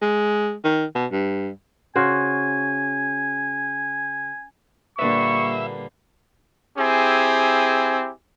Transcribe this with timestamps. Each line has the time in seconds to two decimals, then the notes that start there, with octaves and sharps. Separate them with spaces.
0.02 G#3
0.64 D#3
0.95 B2
1.12 G2
1.96 C#3 F#4 C5 G#5
4.99 A#2 D3 G3 A#3 B4 E5 C#6
6.78 C4 E4 G4 G#4 G#5